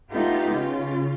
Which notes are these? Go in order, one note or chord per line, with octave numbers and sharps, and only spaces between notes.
A3 B3 D#4 F4 G4
C#3 F4